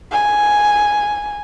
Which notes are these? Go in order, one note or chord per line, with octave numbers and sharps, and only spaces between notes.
G#5